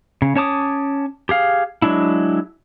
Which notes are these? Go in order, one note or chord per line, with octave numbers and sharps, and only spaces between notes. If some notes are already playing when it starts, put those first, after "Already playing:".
C#3
C#4 C#5 A5 D6 D#6
G4 G#4 F5
F#3 G#3 D4 E4